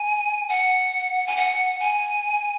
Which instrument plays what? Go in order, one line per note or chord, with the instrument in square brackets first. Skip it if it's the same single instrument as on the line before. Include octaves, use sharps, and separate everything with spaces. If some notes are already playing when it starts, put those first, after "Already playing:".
Already playing: [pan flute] G#5
F#5
G#5
F#5
G#5